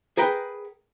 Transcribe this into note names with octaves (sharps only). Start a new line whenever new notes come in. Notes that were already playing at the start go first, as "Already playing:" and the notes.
G#4 A#4 B4 G5